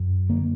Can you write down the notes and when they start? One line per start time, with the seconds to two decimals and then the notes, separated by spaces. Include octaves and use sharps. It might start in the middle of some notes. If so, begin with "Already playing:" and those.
Already playing: F#2
0.30 D3 A#3